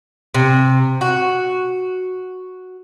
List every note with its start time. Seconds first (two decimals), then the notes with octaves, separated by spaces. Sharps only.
0.34 C3
1.01 F#4